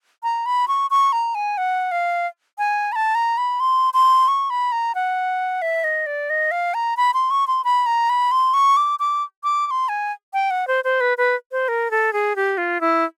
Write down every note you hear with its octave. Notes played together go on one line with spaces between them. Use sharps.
A#5
B5
C#6
C#6
A#5
G#5
F#5
F5
G#5
B5
A5
A#5
B5
C6
C6
C#6
B5
A#5
F#5
E5
D#5
D5
D#5
F5
A#5
B5
C6
C#6
C6
B5
A#5
B5
C6
C#6
D6
D6
D6
D6
C6
G#5
G5
F#5
C5
C5
B4
B4
C5
A#4
A4
G#4
G4
F4
E4